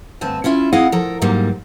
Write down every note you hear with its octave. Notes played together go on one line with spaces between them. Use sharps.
D2 G2 C4 G#5 A5
C#4 E4 F4 E5
C4 E4 G#4 D#5 F5 F#5
F3 A4 A#4 A#5
G#2 F#3 G3 A#3